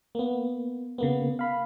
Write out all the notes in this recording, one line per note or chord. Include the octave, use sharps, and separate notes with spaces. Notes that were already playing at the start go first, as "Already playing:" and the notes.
A#3 B3
C#3 A#3 B3
F5 B5